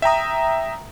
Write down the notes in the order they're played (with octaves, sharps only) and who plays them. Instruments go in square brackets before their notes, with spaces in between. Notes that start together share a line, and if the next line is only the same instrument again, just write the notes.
[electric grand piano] E5 G5 A#5 D#6